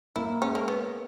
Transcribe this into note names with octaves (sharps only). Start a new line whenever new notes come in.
A#3 E4
G#3 C#4
A#3
B3